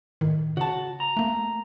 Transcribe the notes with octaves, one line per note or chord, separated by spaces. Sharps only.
A2 D#3
C#3 F#4 A5
A#5
A3 A#3